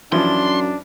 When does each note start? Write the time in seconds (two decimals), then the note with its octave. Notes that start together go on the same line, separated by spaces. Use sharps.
0.12 F#2 E3 F3 D4 C6